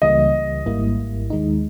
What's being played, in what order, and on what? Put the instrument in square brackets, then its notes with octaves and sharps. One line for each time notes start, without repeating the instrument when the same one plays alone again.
[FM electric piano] C#2 C#3 E3 G3 A#3 [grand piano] D#5
[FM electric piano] G#1 G#2 G3 A#3 E4
D#2 D#3 G#3 D#4